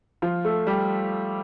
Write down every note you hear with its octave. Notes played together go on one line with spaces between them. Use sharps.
F3 F4
A3 A4
G3 G4